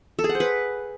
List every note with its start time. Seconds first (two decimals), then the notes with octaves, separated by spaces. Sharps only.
0.19 A4
0.24 G#4
0.29 F#5
0.35 C5
0.40 B4